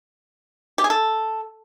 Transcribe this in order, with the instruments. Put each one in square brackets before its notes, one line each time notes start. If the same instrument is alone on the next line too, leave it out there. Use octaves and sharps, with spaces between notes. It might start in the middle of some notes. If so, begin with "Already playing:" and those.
[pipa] G4
G#4
A4